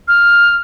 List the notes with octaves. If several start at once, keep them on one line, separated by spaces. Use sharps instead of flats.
F6